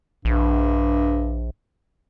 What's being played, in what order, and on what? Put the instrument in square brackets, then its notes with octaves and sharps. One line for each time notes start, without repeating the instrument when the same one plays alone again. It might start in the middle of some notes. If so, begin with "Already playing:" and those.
[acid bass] A#1 [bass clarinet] G2